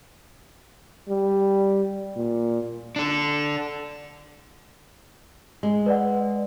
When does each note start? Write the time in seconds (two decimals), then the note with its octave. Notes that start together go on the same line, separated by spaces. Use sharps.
1.08 G3
2.16 A#2
2.96 D4 A4
5.63 G#3
5.86 B4 D5 F#5